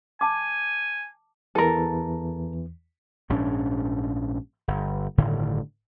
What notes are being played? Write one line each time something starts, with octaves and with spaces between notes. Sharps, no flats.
G#5 A5 D6
E2 E3 A4 A#4
A#1 G#2 C#4 D4
G1
G1 A2 D3 D#3